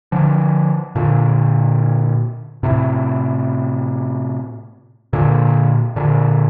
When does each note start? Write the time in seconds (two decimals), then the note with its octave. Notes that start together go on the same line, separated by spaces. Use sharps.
0.12 D3 F3
0.96 A#2 D3
2.63 A2 C3
5.13 A#2 D3
5.96 A#2 D3